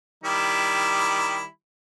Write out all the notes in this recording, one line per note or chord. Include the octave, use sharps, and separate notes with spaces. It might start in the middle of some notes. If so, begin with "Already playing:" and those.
D#3 G3 E4